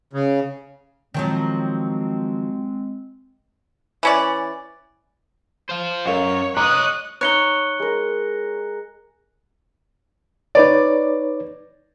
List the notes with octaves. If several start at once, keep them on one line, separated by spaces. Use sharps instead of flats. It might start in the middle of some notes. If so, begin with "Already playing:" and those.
C#3
D#3 F3 F#3 G#3 C4
E3 C#4 D5
C5 F5
F#2 A#4 C#5 D#5 F5
C#5 D#5 A#5 C6 D6 D#6 F#6
D#4 E4 C#5 F#6 C#7 G7
G#3 A#4
D#4 B4 C#5 D5